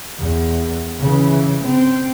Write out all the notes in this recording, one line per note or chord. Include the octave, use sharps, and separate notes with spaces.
E2
C#3 E3
C4